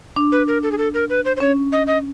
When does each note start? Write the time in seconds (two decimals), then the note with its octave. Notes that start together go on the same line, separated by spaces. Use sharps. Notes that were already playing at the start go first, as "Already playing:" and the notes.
0.16 D4
0.32 B4
0.47 A#4
0.63 A4
0.72 G#4
0.78 A4
0.94 A#4
1.10 B4
1.25 C5
1.37 C5
1.40 C#4 C#5
1.72 D#5
1.87 D#5